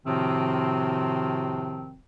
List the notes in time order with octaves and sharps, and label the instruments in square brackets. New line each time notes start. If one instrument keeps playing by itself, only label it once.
[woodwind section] A2 C3 D#3 F3 C4 F#4